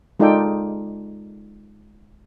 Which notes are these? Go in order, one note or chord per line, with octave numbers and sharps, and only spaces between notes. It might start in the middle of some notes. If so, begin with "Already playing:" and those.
G#3 D#4 F4 A4 D5 G5